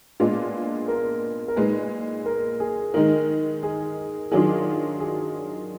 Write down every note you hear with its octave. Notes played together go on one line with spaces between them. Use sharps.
A#2 G#3 B3 D4 F4
A#4
A#4
A#2 G#3 D#4 B4
A#4
G#4
D#3 G#3 D#4 A#4
G#4
D#3 F#3 D4 F4 G#4
G#4